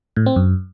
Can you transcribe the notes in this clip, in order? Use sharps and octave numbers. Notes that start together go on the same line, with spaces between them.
A2
C4
F#2